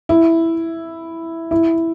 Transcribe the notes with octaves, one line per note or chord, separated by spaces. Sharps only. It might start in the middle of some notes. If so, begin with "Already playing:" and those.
E4
E4